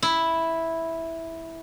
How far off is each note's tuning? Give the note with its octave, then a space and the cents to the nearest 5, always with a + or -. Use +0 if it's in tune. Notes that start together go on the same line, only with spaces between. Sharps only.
E4 -5